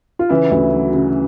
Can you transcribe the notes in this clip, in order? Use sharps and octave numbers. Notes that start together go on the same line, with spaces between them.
F4
C#3 E3 E4
D2
F#3
C#3